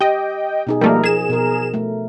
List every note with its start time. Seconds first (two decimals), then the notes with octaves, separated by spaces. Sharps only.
0.01 G4 D#5 G5
0.67 B2 D#4 G#4
0.81 F3 G3 A3 A#3 A#4
1.04 G#4 E7
1.29 B2 A#4
1.74 A3